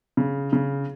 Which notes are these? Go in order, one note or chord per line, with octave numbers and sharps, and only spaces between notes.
C#3
C#3